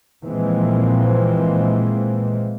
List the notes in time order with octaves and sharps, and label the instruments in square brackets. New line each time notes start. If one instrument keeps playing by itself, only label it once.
[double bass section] A#2 E3 F3 G#3 A#3 C4